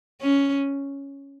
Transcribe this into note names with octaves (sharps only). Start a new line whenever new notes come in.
C#4